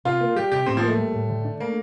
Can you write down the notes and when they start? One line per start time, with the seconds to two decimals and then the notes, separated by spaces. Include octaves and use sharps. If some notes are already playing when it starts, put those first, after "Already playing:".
0.05 C3 F4
0.21 A#3
0.36 G3 G4
0.52 C3 G4
0.66 A2 C4
0.77 F3
0.83 A3 A#3
0.98 G3
1.13 A2
1.30 D3
1.45 D4
1.60 A3 A#3